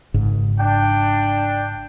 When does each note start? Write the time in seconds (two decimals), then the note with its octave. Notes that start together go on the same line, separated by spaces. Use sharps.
0.14 G#1 G#2 C#3
0.60 D4 G5